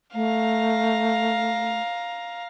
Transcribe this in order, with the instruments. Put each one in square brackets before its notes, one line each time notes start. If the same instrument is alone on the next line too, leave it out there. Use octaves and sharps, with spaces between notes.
[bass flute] A3 [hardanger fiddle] F5 A#5